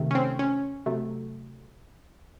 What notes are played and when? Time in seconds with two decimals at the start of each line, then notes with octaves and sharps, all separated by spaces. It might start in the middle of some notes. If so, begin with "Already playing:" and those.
Already playing: C3 D#3 A3
0.11 C#4
0.15 C4
0.39 C#4
0.86 C3 F#3 A3